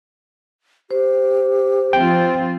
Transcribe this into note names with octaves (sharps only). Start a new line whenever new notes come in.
G4 C5
F3 C4 F4 G5